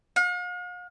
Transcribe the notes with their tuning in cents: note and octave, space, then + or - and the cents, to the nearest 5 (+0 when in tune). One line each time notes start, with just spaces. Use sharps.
F5 +45